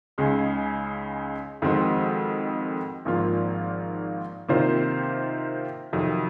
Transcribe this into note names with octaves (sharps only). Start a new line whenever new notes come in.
C#2 C#3 G#3 D#4 G#4
F2 D#3 G#3 C4 F#4
G#1 G#2 F3 A#3 F4
C3 D#3 A#3 F4 C5
F2 C3 D#3 F#3